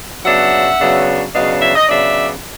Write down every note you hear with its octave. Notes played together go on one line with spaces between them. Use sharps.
C#3 F#3 B3 D4 E5 F#5
C#3 F#3 B3 D4
C#3 F#3 B3 D4 D#5 F5
E5
D#5
C#3 F#3 B3 D4 D5 E5